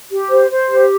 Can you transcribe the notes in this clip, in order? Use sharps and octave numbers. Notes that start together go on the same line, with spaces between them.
G4
C5
C5
G4